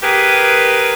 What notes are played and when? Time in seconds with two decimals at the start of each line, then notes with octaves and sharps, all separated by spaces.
0.02 G4 G#4 A#4 B4